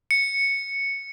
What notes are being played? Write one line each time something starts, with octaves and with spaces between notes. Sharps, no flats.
C#7